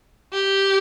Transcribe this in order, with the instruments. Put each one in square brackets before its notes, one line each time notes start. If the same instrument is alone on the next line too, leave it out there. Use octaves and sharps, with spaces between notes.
[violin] G4